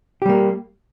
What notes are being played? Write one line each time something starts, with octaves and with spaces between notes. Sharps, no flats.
G3 A#3 G4